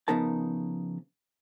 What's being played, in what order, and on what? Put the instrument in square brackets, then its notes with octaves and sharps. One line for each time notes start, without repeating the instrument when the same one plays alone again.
[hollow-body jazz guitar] C#3 F3 B3 D#4 A#4 A5